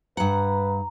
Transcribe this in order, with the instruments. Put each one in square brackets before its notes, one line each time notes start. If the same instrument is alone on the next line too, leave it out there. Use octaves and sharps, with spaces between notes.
[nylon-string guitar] G2 F#5 [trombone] B4 [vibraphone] A#5